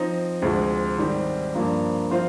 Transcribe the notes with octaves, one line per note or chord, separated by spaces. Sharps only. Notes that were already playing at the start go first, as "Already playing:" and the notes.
Already playing: F3 C4 D#4
D2 C3 F3 G#3
G#2 D#3 G3 C4
G2 F3 A#3 D4
F3 C4 F4 C5